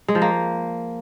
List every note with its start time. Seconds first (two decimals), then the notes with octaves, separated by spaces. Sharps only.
0.08 G#3
0.15 F3
0.22 A#3